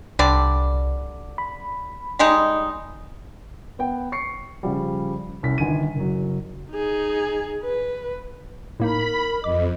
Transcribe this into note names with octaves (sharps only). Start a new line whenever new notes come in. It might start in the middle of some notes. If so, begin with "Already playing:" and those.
C2 D3 G3 D5
B5
G3 G#3 D#4
B3 F#5 G5
C#6 C7 C#7
C#3 F3 G3
C2 C#4 B6
G1 D#3 G#5 D#7
F#1 F#3
D#4 G#4
B4
A2 A#3 D#4 A#4 B5
F2 D#5 D6